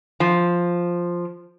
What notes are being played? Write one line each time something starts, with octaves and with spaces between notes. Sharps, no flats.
F3